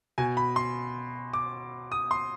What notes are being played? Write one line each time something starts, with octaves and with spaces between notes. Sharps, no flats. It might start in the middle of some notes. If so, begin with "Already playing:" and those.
B2 G#5
B5
C6
D6
D#6
C6